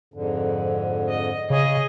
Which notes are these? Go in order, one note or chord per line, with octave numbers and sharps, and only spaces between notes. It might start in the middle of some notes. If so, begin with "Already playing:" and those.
F2 G#2 D3
D#5
C#3 G#4 C#5 D#5